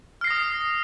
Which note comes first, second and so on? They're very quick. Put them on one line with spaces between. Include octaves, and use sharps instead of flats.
F6 C7 A#6 D#6